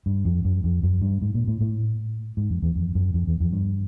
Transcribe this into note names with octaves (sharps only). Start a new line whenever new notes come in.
G2
F2
F#2
F2
F#2
G2
G#2
A#2
A2
A2
G#2
F2
E2
F2
F#2
F2
E2
F2
G2